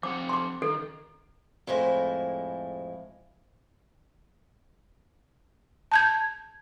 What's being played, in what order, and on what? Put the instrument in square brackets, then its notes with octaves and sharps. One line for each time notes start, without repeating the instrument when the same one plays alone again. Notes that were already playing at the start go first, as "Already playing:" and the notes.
[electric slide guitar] F3 C4 F#5 [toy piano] D6
[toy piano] C6 D6
[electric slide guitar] D#3 [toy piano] A4
[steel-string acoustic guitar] F2 A2 G#3 E4 C5 G#5
[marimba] A5 G6 G#6